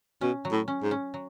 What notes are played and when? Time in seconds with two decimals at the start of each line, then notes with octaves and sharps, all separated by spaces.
0.21 B2 C#4
0.45 F#3
0.52 A2
0.68 C#4
0.83 G#2
0.91 C#4
1.14 F#3